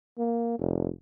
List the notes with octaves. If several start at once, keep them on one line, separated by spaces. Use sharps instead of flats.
A#3
F1